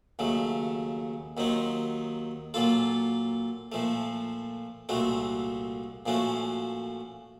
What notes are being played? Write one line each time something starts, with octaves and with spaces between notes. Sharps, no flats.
D#2 C#3 F#3 A3
D#2 D#3 F#3 C4 D#4
A#2 F#3 A#3 F4 A4
A#2 F3 A3
C2 A#2 A3 C4 F#4
A#2 F3 A3 C#4 F#4